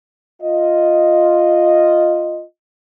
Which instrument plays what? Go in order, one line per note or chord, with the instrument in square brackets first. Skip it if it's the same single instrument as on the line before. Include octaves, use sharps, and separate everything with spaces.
[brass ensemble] F4 D#5